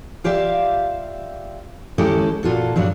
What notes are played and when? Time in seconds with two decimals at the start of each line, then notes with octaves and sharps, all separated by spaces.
0.24 F4 G4 D5 E5 F5
1.98 D#2 G#3 C#4 E4 G4 A4
2.43 A#2 F4 F#4 A4
2.76 G2 F#3 G3 D4